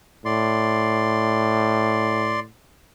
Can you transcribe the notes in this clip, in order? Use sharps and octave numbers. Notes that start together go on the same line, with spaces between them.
A2 D5 C6